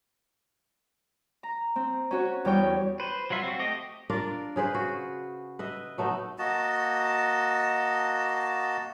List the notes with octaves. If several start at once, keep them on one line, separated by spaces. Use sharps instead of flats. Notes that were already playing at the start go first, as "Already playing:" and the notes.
A#5
C4
C#4 F#4 C#5
E2 G3 G4 C#5 G5
B4 C5
F#3 G3 F4 E5
C4 F#4
A3 G4 D#5
D4 F4 A#4 D5
C#3 G#4 B4 C5
F#4
B4 D#5 E5
F#3 A3 B3 D#4
A#3 F#4 D#5 A5